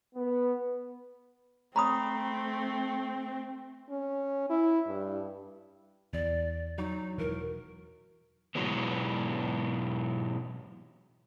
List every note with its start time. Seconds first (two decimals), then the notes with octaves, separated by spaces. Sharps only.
0.15 B3
1.76 A3 C4 A#5 B5 D#6
3.90 C#4
4.49 E4
4.88 G2
6.13 E2 D5
6.78 F#3 D#4
7.18 E1 E3 A#4
8.55 B2 E3 F#3 G#3 B3